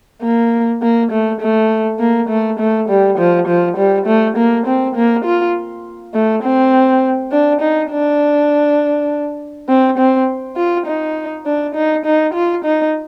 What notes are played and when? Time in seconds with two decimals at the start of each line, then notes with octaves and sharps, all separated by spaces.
0.22 A#3
0.82 A#3
1.12 A3
1.41 A3
2.00 A#3
2.29 A3
2.59 A3
2.89 G3
3.18 F3
3.48 F3
3.77 G3
4.07 A3
4.37 A#3
4.67 C4
4.96 A#3
5.25 F4
6.14 A3
6.43 C4
7.32 D4
7.61 D#4
7.92 D4
9.69 C4
9.98 C4
10.57 F4
10.86 D#4
11.46 D4
11.75 D#4
12.06 D#4
12.34 F4
12.65 D#4